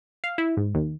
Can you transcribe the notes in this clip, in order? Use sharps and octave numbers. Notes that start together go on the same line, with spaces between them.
F5
E4
G#2
D#2